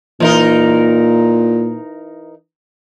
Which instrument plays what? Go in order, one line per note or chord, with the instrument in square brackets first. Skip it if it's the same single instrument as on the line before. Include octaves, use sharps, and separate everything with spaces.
[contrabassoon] A#2 [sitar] E3 D#4 A#4